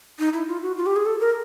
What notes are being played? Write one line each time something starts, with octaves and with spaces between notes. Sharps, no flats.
D#4
E4
F4
F#4
F4
G4
G#4
A4
A#4